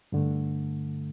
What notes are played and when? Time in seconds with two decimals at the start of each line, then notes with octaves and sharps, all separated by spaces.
0.12 G2 D3 A3